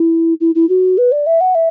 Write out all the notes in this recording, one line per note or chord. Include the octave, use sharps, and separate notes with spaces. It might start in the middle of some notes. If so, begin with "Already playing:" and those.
Already playing: E4
E4
E4
F#4
B4
D5
E5
F#5
E5